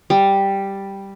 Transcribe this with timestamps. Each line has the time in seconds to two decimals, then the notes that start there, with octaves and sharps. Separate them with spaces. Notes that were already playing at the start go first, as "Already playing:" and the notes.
0.10 G3